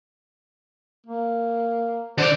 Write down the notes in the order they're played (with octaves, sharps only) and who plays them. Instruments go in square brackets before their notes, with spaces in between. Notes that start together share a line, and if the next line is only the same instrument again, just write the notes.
[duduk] A#3
[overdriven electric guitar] D3 D5 [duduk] C5